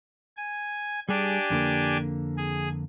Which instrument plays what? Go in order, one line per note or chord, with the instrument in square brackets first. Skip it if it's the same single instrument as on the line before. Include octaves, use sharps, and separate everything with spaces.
[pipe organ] G#5
[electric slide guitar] G3 G#4 [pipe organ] D4 G4 G#5
[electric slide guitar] F2 D3 A#3
[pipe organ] G#4